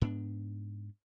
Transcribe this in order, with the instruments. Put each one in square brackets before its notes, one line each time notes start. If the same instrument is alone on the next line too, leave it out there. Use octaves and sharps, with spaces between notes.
[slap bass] G#2 B3 D4